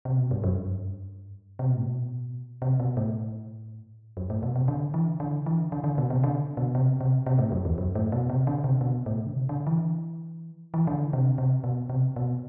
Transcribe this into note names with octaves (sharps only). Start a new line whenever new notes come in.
C3
B2
G2
F#2
G2
C3
B2
A2
B2
C3
B2
A2
F#2
A2
B2
C3
D3
E3
D3
E3
D3
D3
B2
C3
D3
B2
C3
C3
C3
A2
F#2
E2
F#2
A2
B2
C3
D3
C3
B2
A2
D3
C3
D3
E3
E3
D3
C3
C3
B2
C3
B2